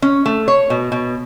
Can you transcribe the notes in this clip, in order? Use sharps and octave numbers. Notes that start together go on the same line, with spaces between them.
C#4
A3
C#5
B2
B2